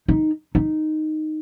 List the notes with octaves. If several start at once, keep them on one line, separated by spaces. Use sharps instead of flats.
D#4
D#4